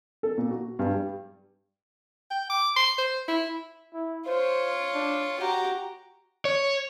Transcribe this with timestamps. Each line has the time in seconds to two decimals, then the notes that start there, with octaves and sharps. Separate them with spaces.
0.23 A4
0.38 A#2
0.51 F#4
0.79 G2
0.94 G3
2.31 G5
2.50 D6
2.76 C6
2.98 C5
3.28 E4
3.93 E4
4.27 F4 C5 C#5
4.95 D4
5.40 F#4 G4 A#5
6.45 C#5